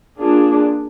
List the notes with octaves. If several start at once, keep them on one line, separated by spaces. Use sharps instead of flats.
A#3 D4 F4 G#4